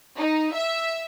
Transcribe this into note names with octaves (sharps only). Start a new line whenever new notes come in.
D#4
E5